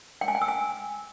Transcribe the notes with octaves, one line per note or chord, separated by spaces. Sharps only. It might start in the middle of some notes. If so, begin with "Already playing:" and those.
G5
G#5
G5
E6
G#5